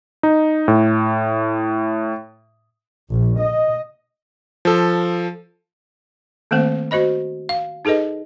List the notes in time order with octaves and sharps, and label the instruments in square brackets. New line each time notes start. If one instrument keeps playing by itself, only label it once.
[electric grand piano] D#4
A2
[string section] A#1
D#5
[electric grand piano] F3 A4
[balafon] D#3 A3 A#3 C4 C5
F#4 C5 D#5 B5
F5
D#4 G#4 A4 B4 D#5